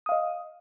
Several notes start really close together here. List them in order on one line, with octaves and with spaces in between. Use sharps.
D#6 F5 D#5